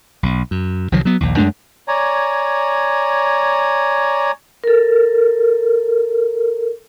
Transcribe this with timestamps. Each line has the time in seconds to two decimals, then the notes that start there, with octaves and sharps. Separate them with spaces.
0.23 B1
0.51 F#2
0.92 C2 D#3 F3 F#3
1.05 F#3 B3
1.21 A#1 D#2
1.37 F#2 G#3 A3 D4
1.88 C#5 D5 G#5 A#5
4.64 A4 A#4